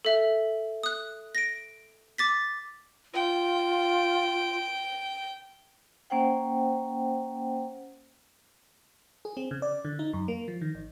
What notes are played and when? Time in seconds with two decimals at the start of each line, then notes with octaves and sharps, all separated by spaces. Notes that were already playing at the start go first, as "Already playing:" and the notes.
0.05 A4 E5
0.83 D#6 F#6
1.35 A#6 D7
2.18 D6 A6 B6
3.14 F4 G5
6.10 A#3 C#4 C5 F#5 G5
9.25 G#4
9.37 C4
9.51 C#3
9.62 D5
9.85 D3
9.99 D#4
10.13 F#2
10.28 A#3
10.48 F3
10.61 D#3
10.75 G#1